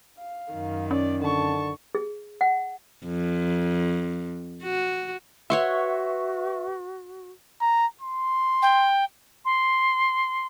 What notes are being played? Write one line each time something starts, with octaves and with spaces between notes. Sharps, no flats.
F5
F#2 D#3
C#4 D5
D3 A5 C#6
G#4
F#5
F2
F#4
F#4 B4 C#5 E5 F#5 C6 C#6
A#5
C6
G5
C6